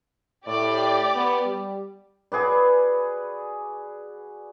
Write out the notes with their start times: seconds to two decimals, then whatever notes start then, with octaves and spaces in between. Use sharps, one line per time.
0.47 A2 G4 D5
1.15 B3
1.45 G3
2.32 F#4 G#4 B4 D5